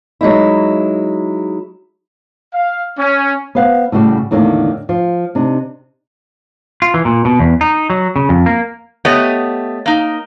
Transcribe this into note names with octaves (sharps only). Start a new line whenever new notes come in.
F#3 G#3 D#4 E4
F5
C#4
B3 C5 F5 F#5
A2 C#3 G3 F#4 G4
E2 A2 D3 D#3 A3 A#3
F3 F4
C3 D4 D#4
F4
E3
A#2
B2
E2
D#4
F#3
C#3
F2
A#3
A3 B3 G4 C#5 D#5
A#3 D#4